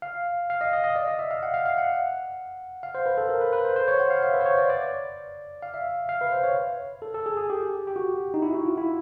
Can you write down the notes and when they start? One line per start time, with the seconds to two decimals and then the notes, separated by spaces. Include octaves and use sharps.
0.02 F5
0.50 F5
0.61 D#5
0.73 D#5
0.84 D#5
0.96 D5
1.08 D#5
1.19 E5
1.31 F5
1.43 F#5
1.54 F5
1.66 F5
1.78 F#5
2.83 F5
2.95 C5
3.06 B4
3.18 A4
3.29 A#4
3.41 B4
3.53 B4
3.65 C5
3.76 C5
3.88 C#5
4.00 F#5
4.10 F5
4.23 E5
4.34 B4
4.41 C5
4.46 C#5
4.58 D5
4.70 D5
5.63 F5
5.74 E5
6.09 F5
6.21 B4
6.32 C5
6.44 C#5
7.02 A4
7.14 A4
7.26 G#4
7.37 G#4
7.50 G4
7.87 G4
7.96 F#4
8.34 D#4
8.42 E4
8.54 F#4
8.65 F4
8.77 E4